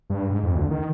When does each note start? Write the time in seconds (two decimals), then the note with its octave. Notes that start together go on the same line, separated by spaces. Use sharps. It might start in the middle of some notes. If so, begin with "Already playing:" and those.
0.10 G2
0.30 G#2
0.43 F2
0.55 D2
0.71 D#3